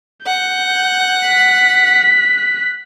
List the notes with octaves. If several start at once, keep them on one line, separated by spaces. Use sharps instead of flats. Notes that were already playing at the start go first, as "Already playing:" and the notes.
F#5 G6
F#6 B6